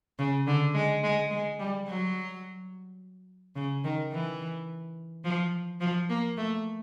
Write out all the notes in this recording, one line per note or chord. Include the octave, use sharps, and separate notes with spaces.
C#3
D3
G#3
G#3
G#3
G3
F#3
C#3
D#3
E3
F3
F3
A#3
A3